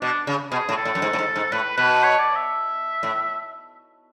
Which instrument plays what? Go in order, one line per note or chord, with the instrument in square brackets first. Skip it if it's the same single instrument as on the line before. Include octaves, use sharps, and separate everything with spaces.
[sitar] B2 [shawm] D4
[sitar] C#3
[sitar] B2 [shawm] G#4
[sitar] A2
[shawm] A4
[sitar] A2
F#2
G#2
A2
G#2
G#2
[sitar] A2 [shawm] B4
[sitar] B2 [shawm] B4
[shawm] C#5
D5
E5
[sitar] A2